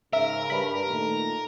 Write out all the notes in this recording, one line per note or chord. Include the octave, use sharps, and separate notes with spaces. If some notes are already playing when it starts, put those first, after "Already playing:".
G#2 C#3 A#4 E5
G2 B5
A#2 D#3 A3